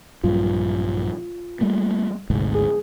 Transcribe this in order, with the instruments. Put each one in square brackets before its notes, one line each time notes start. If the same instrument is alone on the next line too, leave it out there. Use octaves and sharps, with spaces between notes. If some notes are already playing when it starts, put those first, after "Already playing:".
[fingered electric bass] A#1 G2 F#3 [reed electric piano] F4
[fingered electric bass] G3 A3 A#3
[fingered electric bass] G#1 D2 G#2 [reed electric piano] C3
[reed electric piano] G#4